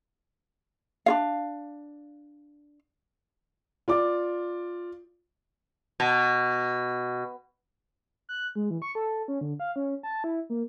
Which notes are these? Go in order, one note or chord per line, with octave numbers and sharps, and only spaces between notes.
D4 F4 F5
F4 D5 D6
B2
F#6
G#3
E3
C#6
A4
C#4
D3
F5
C#4
A5
E4
A#3